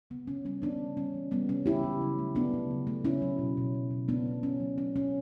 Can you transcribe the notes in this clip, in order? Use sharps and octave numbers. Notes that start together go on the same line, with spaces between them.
C#3 B3
C#3 C#4
G3 C#4
E3 B3 D4
C#3
G3 C#4
E3
G3 B3
C#3 C#4
C#3 E4 G4
C#3
F#3
A3
A3 B3 D4
C#3
F#3
A3
C#3 C#4 E4
F#3
B2
B2
F#3
B2
A3 B3 D4
B2
B2 C#4
F#3
A3 C#4
B2 C#4